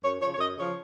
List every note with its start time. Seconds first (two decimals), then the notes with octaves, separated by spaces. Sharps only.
0.02 F#2 C#5
0.19 F3 C#5
0.23 C#3
0.34 C#5
0.38 F#2 D#5
0.57 C#3 F3 C#5